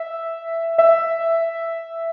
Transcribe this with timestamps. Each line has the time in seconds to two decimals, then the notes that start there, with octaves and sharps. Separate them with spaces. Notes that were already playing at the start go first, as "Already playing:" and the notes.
Already playing: E5
0.78 E5